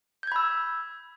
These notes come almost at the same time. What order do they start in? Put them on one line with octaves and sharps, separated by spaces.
G6 G#6 B5 E6